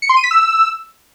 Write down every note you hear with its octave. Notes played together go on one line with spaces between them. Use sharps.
C#7
C6
D#7
B6
E6